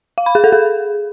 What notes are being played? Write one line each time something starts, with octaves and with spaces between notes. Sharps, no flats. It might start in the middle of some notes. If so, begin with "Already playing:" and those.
F5
B5
G#4
A4
G#4